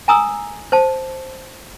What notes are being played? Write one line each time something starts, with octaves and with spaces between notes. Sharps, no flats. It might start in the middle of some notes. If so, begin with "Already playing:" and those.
G#5 A#5 D#6 E6
C5 A5